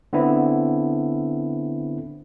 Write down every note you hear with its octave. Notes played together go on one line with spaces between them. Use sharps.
D3 B3 C4 E4